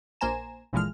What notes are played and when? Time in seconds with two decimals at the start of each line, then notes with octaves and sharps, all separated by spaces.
0.21 A#1 A#3 C5 G#5 A#5 E7
0.73 G1 A#2 E3 F3 G#3 F6